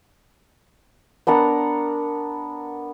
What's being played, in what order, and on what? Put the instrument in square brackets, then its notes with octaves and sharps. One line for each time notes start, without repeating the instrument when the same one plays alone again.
[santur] B3 D4 A#4 F#5